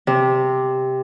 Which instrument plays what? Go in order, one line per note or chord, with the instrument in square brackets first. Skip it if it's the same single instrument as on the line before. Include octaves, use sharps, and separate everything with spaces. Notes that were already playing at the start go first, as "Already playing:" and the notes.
[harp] C3